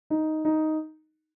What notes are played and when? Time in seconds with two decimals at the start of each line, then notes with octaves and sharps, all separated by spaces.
0.10 D#4
0.45 D#4